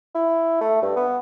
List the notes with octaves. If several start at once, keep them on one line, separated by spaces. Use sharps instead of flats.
E4
A3
G2
B3